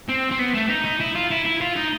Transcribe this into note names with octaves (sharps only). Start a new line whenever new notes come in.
C4
C4
B3
A3
D#4
D#4
E4
F4
E4
E4
F4
D#4